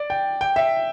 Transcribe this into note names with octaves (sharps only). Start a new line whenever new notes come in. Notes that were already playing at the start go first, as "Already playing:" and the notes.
Already playing: D5
G5
G5
E5